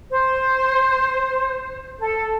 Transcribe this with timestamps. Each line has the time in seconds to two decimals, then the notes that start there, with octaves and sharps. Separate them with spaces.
0.12 C5
1.99 A4